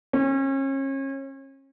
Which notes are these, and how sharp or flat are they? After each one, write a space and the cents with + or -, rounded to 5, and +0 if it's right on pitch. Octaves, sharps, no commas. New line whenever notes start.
C#4 -35